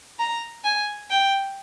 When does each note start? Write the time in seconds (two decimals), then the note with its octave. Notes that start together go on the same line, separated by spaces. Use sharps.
0.19 A#5
0.65 G#5
1.10 G5